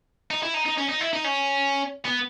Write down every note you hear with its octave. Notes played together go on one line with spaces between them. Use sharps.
D#4
E4
D#4
D#4
C#4
D#4
E4
D#4
C#4
B3